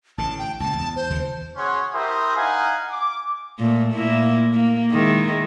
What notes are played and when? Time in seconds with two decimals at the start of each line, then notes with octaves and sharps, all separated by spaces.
0.18 A1 D3 A5
0.39 G5
0.60 C#2 A#2 A5
0.76 E2
0.96 C5
1.10 D#2 C#3 E3
1.56 C#4 F#4 G#4 C#5 F#5 C6
1.93 E4 G4 A#4 C5 E5 D#6
2.36 D#4 F5 F#5 G#5
2.91 D6
3.59 A#2 A3
3.93 A#2 A#3 E4
4.54 A#3
4.91 D#3 G#3 E4